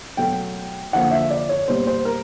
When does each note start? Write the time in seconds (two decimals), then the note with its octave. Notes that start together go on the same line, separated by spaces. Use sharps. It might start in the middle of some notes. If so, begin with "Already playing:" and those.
0.17 B2 F#3 A3 G5
0.92 D3 F3 A#3 F#5
1.11 E5
1.31 D5
1.49 C#5
1.68 B2 G3 A#3 C5
1.87 C5
2.05 A#4